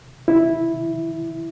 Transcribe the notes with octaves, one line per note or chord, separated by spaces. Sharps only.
E4